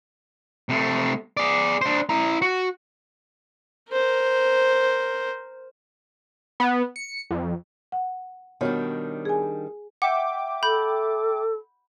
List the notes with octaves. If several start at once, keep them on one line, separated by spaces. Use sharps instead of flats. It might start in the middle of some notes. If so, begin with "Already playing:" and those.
C3 A3
G#4 D5
D4 C5
E4 A#5
F#4
A#4 C5
B3
C#7
F2
F#5
B2 D#3 G3 D4 C#5
G#4 G#5
E5 F#5 G5 D6
A4 B5 G6